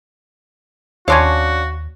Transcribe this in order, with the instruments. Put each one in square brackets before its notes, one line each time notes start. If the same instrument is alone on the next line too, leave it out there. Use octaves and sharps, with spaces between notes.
[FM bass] D#2 [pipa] C#4 D4 F5 [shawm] F#4 [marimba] C#5 C6 G#6